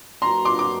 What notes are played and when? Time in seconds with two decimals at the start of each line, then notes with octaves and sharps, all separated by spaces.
0.22 F#3 A#3 D4 F#4 B4 A#5 C6
0.45 C6 D6
0.59 D6